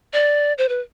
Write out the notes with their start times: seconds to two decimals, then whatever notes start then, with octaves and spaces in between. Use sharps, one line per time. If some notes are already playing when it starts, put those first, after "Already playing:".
0.13 D5
0.58 C5
0.69 B4